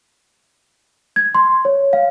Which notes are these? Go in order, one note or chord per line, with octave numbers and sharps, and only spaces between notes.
G#6
C6
C#5
F5